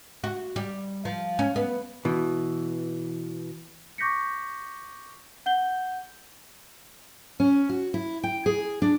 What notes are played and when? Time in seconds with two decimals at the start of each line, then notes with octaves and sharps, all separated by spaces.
0.24 F#4
0.56 G3
1.05 F3
1.39 C#4
1.56 B3
2.05 B2 E3
3.98 C#6 D6 G6 A#6 B6 C#7
5.46 F#5 G6 G7
7.40 C#4
7.69 F#4
7.94 E4
8.24 G5
8.46 G#4
8.82 D4